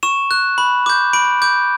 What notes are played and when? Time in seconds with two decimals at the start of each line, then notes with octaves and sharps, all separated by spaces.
0.03 C#6 E7
0.31 F#6
0.58 B5
0.86 D6 G6
1.13 B5 D7
1.42 D6 G6